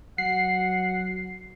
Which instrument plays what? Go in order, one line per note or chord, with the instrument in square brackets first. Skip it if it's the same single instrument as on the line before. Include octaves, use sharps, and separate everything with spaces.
[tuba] F#3 [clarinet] F#5 [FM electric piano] C7